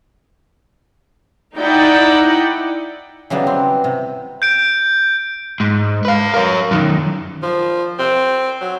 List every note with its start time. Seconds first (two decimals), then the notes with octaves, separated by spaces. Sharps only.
1.56 D#4 E4 D5 F#5 G5
3.30 C#3 E3 F#3 G3 B3
3.47 C4
3.84 C3
4.42 G6 D7
5.60 G#2
6.05 B4 F5
6.34 A#4 C#5
6.71 F#2 D#3
7.43 F3
7.99 C4
8.61 F#3